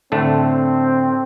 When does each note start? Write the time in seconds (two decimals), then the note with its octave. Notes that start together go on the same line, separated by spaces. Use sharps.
0.12 A2 D3 A3 C4